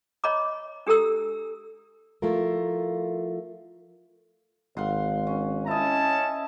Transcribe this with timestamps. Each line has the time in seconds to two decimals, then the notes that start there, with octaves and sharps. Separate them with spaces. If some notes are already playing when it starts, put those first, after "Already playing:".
0.24 C#5 D#5 A#5 B5 D6
0.87 D4 G4 A4 A#5 E6
2.22 F3 A3 E4 F4 A#4
4.77 G#1 F5 F#5 C6
5.27 C#4
5.67 C#4 E4 D#5 A5